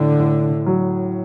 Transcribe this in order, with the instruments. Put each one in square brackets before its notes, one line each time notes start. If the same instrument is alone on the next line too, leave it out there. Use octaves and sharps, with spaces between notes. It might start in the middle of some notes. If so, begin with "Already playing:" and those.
Already playing: [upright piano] A2 [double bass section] D3
[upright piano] A2
F#3